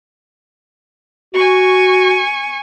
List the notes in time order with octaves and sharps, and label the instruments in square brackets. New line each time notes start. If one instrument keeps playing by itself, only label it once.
[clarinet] F#4 [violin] G#5 C#6